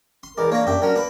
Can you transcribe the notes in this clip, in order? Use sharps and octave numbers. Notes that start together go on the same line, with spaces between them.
C6
E2 G#3 A#4 D5
A#3 D4 C#5 A#5
F#2 G4 E5
F#3 C#4 A#4
A#3 B4